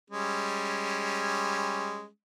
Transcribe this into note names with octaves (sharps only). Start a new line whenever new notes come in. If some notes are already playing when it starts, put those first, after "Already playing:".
G3 G#3 C#4